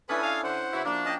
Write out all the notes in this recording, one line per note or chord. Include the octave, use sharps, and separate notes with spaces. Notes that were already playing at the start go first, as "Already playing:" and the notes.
C#4 D4 E4 A4 B4 G#5 D#6
F5
D3 C5 F#5
C#3 B3 E4 F#4
F3 A#3 D4
C#4 D#5 G5 A5